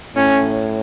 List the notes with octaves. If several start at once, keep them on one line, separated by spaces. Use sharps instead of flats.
A2 C#4